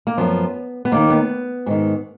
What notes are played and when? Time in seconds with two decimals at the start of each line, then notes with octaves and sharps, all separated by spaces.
0.07 A#3
0.18 F#2 F3 B3
0.85 B3
0.92 D#2 D#3 A#3
1.10 B3
1.66 G#2 D#3